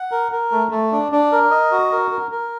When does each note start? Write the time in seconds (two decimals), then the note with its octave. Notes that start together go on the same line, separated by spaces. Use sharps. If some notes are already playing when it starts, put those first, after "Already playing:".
Already playing: F#5
0.12 A#4
0.32 A#4
0.52 A3
0.71 A3
0.92 D4
1.12 D4
1.32 A#4
1.51 D#5
1.71 F#4
1.92 A#4
2.11 A#4
2.31 A#4